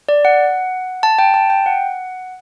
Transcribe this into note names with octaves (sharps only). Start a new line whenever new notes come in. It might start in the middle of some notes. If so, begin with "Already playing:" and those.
D5
F#5
A5
G5
A5
G5
F#5